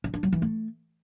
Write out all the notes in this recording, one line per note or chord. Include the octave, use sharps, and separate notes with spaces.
C#4
D4
F#3
E3
A3